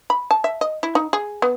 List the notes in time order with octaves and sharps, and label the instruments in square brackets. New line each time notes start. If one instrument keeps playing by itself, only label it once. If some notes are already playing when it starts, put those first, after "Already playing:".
[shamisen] B5
A5
E5
D#5
E4
D#4
G#4
B3